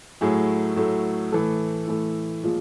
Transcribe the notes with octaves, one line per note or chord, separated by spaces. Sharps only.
A2 F#3 A3 G#4
A2 F#3 A3
A2 E3 A3 A4
A2 E3 A3
A#2 F3 G#3